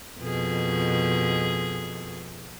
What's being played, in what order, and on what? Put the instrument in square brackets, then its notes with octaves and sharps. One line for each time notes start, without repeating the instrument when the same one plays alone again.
[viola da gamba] F2 B2 G#4